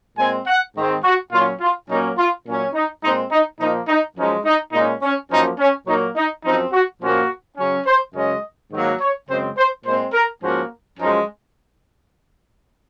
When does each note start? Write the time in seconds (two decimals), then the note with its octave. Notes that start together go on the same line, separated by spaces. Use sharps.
0.18 A#2 G#3 C4 G#5
0.47 F#5
0.76 G#2 D#3 G#3 C4
1.04 F#4
1.32 A#2 F#3 C#4 F4
1.61 F4
1.88 A#2 F#3 A#3 C#4 D#4
2.18 F4
2.46 A#2 F#3 C#4
2.74 D#4
3.03 A#2 G#3 C4 D#4
3.31 D#4
3.59 A#2 F3 A#3 D#4
3.88 D#4
4.17 F#2 F3 G#3 C#4 D#4
4.45 D#4
4.73 A#2 G#3 C#4 D#4
5.02 C#4
5.31 F#2 F3 A#3 C#4 D#4
5.59 C#4
5.87 A#2 F#3 A#3 D#4
6.16 D#4
6.44 F#2 F3 C4 D#4
6.72 F#4
7.01 A#2 F3 A#3 C#4 F#4
7.57 C#3 F#3 C#4
7.86 C5
8.14 F#2 C#3 G#3 C#4 D#5
8.72 G#2 D#3 F#3 A#3
9.00 C#5
9.28 F#2 C#3 G#3 C4 C5
9.57 C5
9.85 A#2 G#3 C4 C5
10.14 A#4
10.42 G#2 F3 A#3 C#4 F#4
10.99 F#2 F3 G#3 C#4 D#4